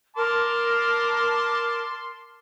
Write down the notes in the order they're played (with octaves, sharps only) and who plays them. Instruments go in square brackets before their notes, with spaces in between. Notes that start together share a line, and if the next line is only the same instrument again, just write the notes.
[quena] A#4 [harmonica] A5 C6 D6